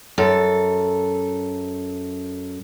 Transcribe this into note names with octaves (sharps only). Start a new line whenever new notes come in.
F#2 A4